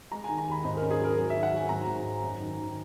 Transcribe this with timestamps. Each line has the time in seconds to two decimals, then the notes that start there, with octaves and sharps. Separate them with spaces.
0.12 G#3 A#5
0.24 D#3 G#5
0.38 A#5
0.47 D#2 B5
0.64 G#2 D#5
0.77 C#4 A#4
0.91 G#4
0.99 F#3
1.04 A#4
1.17 F#3
1.30 E5
1.35 D#3
1.43 F#5
1.51 F#3 G#5
1.69 G#2 A#5
1.87 G#2
2.04 D#4
2.22 F#2
2.40 D#3
2.57 D#3